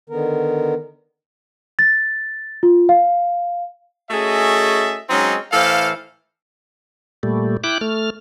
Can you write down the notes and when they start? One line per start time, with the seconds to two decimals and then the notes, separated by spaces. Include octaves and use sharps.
0.10 D3 D#3 B3 A#4
1.79 A6
2.63 F4
2.89 F5
4.11 A3 C#4 F#4 G#4 D#5 E5
5.10 F#3 G#3 C4 C#4 D#4
5.52 A2 E3 A4 C5 F5
7.23 A#2 G3 A3
7.64 E4 G5 D6 F#6
7.81 A3 F6